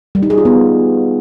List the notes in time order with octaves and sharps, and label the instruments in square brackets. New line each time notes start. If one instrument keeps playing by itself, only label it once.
[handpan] G3
D#4
G#4
F4
B3